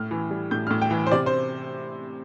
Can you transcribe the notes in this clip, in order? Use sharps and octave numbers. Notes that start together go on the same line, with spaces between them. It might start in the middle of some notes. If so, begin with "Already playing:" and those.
Already playing: A2 F6
E3
G3
A2 G6
F6
A2
G5
E3
C5
C3 D5
C5